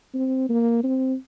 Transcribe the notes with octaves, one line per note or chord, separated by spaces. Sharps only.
C4
A#3
C4